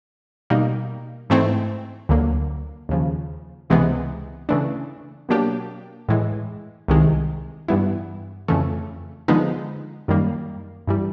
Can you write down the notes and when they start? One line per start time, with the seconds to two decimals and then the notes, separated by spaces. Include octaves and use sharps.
0.50 B2 G3 A#3 D#4
1.30 G#2 E3 A3 C4 E4
2.09 D2 D3 F#3 A#3
2.89 D#2 C#3 F3
3.70 C#2 C3 E3 G#3 B3
4.49 C#3 E3 A3 D4
5.29 B2 F#3 A#3 D4 G4
6.09 A2 E3 G#3
6.88 C2 C3 D#3 G#3
7.68 G2 E3 G3 B3 E4
8.48 F2 C#3 E3 A3
9.28 D3 F3 G#3 B3 D#4
10.08 F#2 D#3 G3 A#3
10.87 G2 E3 G3